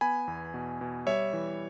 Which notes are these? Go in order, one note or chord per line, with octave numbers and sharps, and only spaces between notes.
B3 G#5 B5
E2
B2
B2
G3 C#5 E5
E3